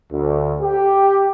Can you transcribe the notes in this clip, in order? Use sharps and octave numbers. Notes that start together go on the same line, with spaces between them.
D2
G4